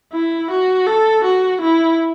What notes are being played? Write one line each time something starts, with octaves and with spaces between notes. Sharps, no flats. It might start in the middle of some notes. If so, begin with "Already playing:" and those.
E4
F#4
A4
F#4
E4